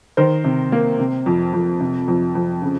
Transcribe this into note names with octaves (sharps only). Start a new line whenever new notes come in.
D#3 A#4 C5
C3
A#3
C3
F2
F2
C3
F2
F2
C#3